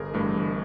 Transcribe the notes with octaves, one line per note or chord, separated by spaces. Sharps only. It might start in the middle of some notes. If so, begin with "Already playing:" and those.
Already playing: G1 G#4 A#4
G2 E3 A3
G1